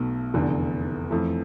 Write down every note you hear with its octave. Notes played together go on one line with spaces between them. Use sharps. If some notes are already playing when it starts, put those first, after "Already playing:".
Already playing: B1 B2 A3
F1 E2 D3
F2 E3 A3